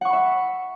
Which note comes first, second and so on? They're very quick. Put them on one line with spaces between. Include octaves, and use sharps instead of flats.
F#5 C#6 B5 E5